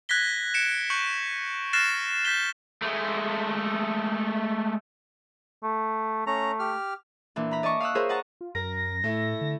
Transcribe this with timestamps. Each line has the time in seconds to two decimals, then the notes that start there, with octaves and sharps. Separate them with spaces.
0.09 F#6 G#6 A#6 B6 G7
0.54 C#7 D7 E7
0.90 C#6 F#6 G6 C#7 D7 F#7
1.73 F6 F#6 A6 A#6 C7 E7
2.25 F#6 G6 B6 E7 G7
2.82 G#3 A3
5.63 A3
6.27 A3 C#4 A#5
6.59 G4 F6
7.36 A#2 E3 D4
7.51 A#5 B5
7.63 D5 D#5 A5 C#6 D6
7.80 F5 D#6 E6 F#6
7.95 F4 G#4 A#4 C5 C#5 E5
8.09 D#5 F#5 A5 A#5 C#6
8.41 F4
8.55 F#2 A#4 A#6
9.04 A2 A3 E4
9.41 D3